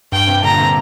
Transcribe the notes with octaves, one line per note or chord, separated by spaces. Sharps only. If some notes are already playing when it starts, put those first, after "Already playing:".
G2 G5
G2 C3
A#2 D3 A#5
C3